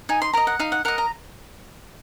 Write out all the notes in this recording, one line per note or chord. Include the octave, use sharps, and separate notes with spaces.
D#4 G#5
C6
A#4 D#5 A#5
F#5
D#4 F5
F#5
A#4 D#5 F#5
A#5